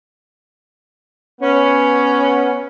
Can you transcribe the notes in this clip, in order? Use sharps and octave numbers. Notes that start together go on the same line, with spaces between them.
B3 C#4